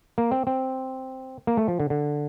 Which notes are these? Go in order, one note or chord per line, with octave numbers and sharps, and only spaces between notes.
A#3
C4
C4
A#3
A3
F3
D3
D3